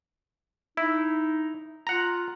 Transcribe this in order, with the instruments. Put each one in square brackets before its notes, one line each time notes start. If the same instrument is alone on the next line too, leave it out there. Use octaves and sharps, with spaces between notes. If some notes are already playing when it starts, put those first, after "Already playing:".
[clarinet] D#4 [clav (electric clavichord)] E4
[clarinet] F4 [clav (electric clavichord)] F#5 A#5